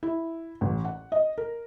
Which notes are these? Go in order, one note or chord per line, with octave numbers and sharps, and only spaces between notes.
E4
A1
F#5
D#5
A#4